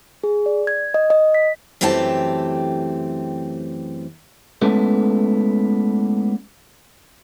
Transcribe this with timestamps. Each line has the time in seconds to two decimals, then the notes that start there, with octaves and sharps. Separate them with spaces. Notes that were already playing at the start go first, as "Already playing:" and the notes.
0.24 G#4
0.46 D5
0.67 G#6
0.94 D#5
1.10 D#5
1.35 B6
1.81 F#2 E3 A3 C4 G4 A5
4.62 G#3 A3 B3 C#4 E4 A4